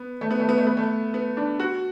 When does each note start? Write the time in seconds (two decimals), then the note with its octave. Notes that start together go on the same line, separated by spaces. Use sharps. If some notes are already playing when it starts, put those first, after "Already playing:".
Already playing: B3
0.21 A3
0.31 B3
0.40 A3
0.49 B3
0.58 A3
0.67 B3
0.77 A3
1.14 B3
1.37 D4
1.60 F#4